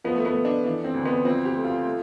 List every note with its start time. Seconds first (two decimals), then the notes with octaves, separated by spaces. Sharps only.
0.04 F3 B3
0.16 A3
0.25 B3
0.35 A3
0.45 D4
0.64 E3 D4
0.84 C4
0.94 D2
1.05 B3
1.24 F3 C4
1.45 G4
1.54 A3
1.64 F4
1.84 A3